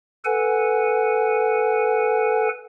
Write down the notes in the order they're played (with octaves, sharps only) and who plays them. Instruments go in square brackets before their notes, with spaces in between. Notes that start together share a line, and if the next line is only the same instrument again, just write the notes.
[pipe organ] A4 B4 F#5 G#5